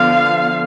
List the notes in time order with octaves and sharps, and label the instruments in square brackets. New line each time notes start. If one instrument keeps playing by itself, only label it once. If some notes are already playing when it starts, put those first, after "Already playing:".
Already playing: [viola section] D3 F3 B3 F5